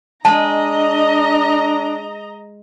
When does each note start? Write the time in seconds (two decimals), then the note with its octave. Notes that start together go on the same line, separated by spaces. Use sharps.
0.25 G#3 D4 D#5 A5 A#5